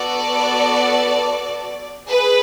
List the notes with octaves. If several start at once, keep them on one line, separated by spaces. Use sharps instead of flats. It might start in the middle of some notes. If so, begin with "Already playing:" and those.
Already playing: B3 F#4 A4 D5
G#4 B4